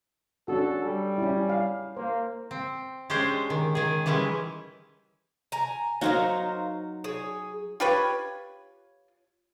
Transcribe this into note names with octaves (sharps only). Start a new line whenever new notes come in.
C#4 D4 F#4 A4
G3
C#4 E4
F5
A#3 C5
C4
G#3 C#4 D4 G4 C5
D#3
D#3 G#4
E3 G3 G#3 C#4 E4
G#5 A#5
F#3 D#4 F#4 A#4 C5 F5
G#4 C#5
F4 G4 B4 C#5